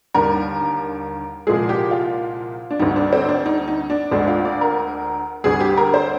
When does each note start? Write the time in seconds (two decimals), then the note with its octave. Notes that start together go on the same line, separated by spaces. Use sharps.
0.14 D#2 D3 G3 A#4
1.47 C2 A#2 F3 G#3 G#4
1.69 G4
1.91 F4
2.71 D4
2.79 D2 D3 G3 D#4
2.96 D4
3.13 C4
3.29 D4
3.46 D#4
3.68 D#4
3.90 D4
4.12 D2 D3 G#3 D4
4.28 F4
4.45 D5
4.61 A#4
5.44 D2 D3 G3 G#4
5.60 G4
5.77 A#4
5.94 C5